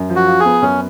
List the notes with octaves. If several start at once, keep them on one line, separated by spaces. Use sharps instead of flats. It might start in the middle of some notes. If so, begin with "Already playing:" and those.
Already playing: F#2
F3
F#4
F4
G#4
B3
F#2 C#4